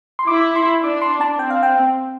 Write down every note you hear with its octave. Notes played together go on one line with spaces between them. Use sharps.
C6
E4 D6
C6
D4 D6
C6
A5
C4 G5
F5
G5